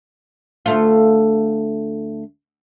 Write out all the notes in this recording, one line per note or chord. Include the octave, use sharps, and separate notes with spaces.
D2 A3 F4